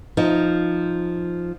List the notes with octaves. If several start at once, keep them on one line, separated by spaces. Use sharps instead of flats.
F3 D#4